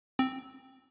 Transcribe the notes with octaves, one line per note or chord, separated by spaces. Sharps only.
C4